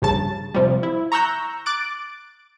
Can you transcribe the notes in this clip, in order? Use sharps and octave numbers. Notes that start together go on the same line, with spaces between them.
A#1 G2 C#3 A5 A6
C3 F3 G3
E4
A#5 C#6 E6 F#6 G6 A#6
D6 F#6 A6 D7